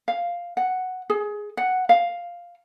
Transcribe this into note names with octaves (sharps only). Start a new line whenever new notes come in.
F5
F#5
G#4
F#5
F5